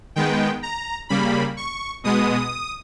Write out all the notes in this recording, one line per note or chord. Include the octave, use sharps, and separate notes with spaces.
D#3 G#3 B3 G5
A#5
C#3 G3 A#3 B5
C#6
B2 G#3 B3 D#6